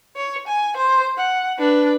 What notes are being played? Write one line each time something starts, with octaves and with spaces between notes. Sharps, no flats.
C#5
G#5
C5
F#5
D4 B4